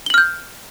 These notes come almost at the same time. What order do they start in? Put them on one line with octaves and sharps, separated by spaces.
G7 F#7 F6 G6